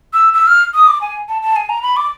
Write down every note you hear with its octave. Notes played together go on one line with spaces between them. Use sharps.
E6
E6
F6
D#6
D6
G#5
A5
A5
G#5
A#5
B5
D6